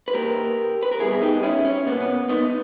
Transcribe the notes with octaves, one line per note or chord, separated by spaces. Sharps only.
B4
A#2 A#3 G4 A#4
B4
A#4
B2 G3 B3 E4 G#4
D#4 G4
C#4 E4
C#4
B2 A#3 B3
B3
B3 D#4